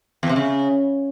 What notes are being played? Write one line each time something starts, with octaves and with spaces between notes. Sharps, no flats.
E2
C3
C#3